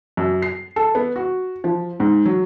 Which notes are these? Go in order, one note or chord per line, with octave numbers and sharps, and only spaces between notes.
F#2
C7
A4
B3
F#4
F3
G#2
F#3